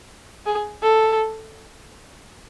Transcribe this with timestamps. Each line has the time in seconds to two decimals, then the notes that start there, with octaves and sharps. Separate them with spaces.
0.46 G#4
0.83 A4